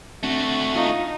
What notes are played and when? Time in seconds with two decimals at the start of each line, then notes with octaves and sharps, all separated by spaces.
0.23 A3 C4 D4 F#4
0.76 D#4 F4